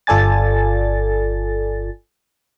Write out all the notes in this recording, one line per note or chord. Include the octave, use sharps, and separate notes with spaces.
G1 F4 A4 D5 G#5 A6